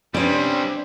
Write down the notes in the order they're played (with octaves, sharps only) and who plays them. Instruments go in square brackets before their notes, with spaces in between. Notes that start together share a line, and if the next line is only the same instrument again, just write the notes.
[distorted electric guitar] C3 G3 [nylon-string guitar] C#4 [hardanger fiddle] D4 B4 [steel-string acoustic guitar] C5 D5